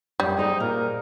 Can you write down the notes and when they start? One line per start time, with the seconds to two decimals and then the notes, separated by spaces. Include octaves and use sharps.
0.20 F#2 G3
0.37 D#4 G#4 C5 D5
0.60 A#2 A#4